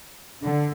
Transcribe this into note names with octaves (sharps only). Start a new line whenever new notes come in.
D3